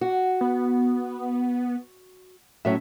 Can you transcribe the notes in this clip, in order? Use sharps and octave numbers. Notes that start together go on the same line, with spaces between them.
F#4
B3
A2 F#3 C#4 E5